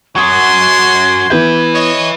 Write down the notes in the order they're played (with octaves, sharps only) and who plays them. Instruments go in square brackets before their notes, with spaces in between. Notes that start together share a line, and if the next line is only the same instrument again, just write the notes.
[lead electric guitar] F#2 F#3 [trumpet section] F#4 C6 [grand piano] C#6 D#6 [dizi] G#6
[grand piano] E3 B3 G6 [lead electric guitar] E4 B4
[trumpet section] C#5 D#5